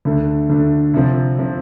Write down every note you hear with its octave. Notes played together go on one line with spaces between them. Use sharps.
D2 D3 A3 D4
D2 D3 A3 D4
C2 C3 F3 C4
C3 F3 C4